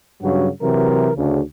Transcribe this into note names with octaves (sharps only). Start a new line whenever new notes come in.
G2 C#3 F#3 F#4
C3 E3 F#3 A#4
D2 C#3